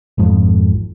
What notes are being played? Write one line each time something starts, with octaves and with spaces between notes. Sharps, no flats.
G#1 F2